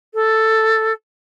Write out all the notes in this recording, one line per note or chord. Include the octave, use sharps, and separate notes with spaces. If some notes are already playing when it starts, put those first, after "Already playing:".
A4